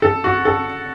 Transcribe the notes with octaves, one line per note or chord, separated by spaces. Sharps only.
A4
F#4
A4